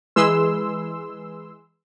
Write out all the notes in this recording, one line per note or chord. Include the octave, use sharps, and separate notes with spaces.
E3 G#3 G#4 B4 C6 E6